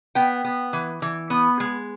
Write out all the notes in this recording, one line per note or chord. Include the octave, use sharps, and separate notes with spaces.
B3 G5
B3
E3
E3
B3
G#3